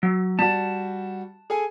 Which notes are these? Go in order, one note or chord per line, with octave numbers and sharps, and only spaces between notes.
F#3
G3 F#4 A5
G#4 A4 G#5